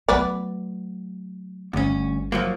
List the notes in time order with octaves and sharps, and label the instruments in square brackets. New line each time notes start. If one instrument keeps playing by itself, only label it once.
[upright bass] F#3 A3 [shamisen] B3 B4 D5
[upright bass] G1 [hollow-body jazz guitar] D2 C#4
[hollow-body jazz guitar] F3 F#3 A#3